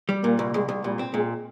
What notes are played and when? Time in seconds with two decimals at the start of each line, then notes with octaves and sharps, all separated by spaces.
0.09 G3
0.23 A#2 A#3
0.39 C2
0.54 C2 G#3
0.69 C2
0.84 A#2 G3
0.99 C4
1.14 A#2 G#3